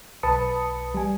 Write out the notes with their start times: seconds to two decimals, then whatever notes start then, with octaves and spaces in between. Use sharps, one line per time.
0.23 B1 B4 A5 B5 D#6 C#7
0.94 G3 G#5